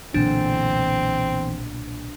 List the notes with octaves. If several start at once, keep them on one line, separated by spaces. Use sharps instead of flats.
B1 E2 A#2 D3 C4 D4